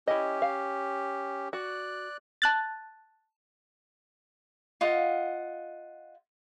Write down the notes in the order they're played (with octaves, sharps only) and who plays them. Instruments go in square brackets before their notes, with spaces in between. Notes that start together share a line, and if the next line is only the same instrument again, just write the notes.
[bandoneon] C#4 G4 [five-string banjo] E4 D#5
[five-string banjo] F5
[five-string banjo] F#4 [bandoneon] D5 F#6
[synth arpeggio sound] A5 F#6 A6
[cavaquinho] F4 D#5 F5 F#5